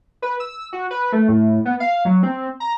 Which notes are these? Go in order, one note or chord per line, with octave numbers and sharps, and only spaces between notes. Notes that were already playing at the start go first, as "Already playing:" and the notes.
B4
E6
F#4
B4
A3
A2
B3
F5
F#3
C4
A#5